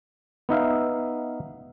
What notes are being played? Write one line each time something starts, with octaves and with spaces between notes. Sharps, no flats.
B3 D#4 E5 F5